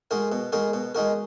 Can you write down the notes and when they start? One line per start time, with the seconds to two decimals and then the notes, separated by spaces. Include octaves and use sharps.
0.11 G#3 D#4 F#4 A#4
0.32 B2
0.52 G#3 D#4 F#4 A#4
0.73 B2
0.95 G#3 D#4 F#4 A#4